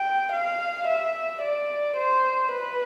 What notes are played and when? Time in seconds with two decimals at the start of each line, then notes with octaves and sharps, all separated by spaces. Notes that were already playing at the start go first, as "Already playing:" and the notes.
Already playing: G5
0.32 F5
0.87 E5
1.42 D5
1.97 C5
2.51 B4